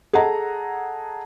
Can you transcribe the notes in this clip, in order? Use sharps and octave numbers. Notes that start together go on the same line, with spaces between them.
G#4 A4 D#5 F#5 A#5